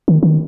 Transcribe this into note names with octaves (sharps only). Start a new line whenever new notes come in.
D#3
D#3